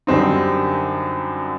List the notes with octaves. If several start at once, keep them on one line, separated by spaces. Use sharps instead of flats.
F#2 D3 G3 C4 D#4